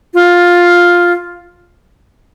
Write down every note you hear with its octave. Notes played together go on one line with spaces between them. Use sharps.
F4